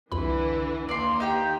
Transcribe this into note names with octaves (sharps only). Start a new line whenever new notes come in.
C2 F2 D3 E3 E4 B5
D#2 A#3 D5 C6
D#4 G4 G5